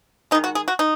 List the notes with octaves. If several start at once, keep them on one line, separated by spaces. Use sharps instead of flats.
D#3 G#3 D#4
F#4
G#4
F#4
D#4